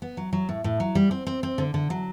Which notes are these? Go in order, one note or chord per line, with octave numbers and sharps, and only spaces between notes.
B3
F#3
F#3
A2
A2
F#3
G3
C4
C4
C4
D3
D3
F#3